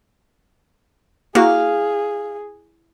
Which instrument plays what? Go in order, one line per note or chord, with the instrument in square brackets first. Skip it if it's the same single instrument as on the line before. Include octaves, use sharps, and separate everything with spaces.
[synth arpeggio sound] A#3 F#4 [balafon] E4 [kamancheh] G#4 [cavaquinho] F5